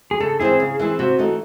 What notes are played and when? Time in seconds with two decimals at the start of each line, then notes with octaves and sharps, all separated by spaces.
0.11 G#4
0.20 C#3 A4
0.40 E3 C4 E4 G#4
0.60 C#3
0.79 E3 C4 E4
0.99 C3 F#4
1.19 E3 A3 D#4